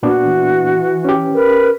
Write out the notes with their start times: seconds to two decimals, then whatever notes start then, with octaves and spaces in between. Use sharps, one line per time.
0.03 A#2 B3 D4 F#4
0.24 E3
1.05 C#4 G4
1.34 A#4 B4